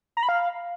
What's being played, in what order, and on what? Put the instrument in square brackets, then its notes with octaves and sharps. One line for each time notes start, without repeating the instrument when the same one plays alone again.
[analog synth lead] A#5
B5
F5